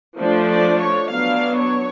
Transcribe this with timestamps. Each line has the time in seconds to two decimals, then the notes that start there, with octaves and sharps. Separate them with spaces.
0.17 F3 A3 D4
0.48 D5
0.80 C#5
1.10 F#3 B3 D4 F5
1.57 C#5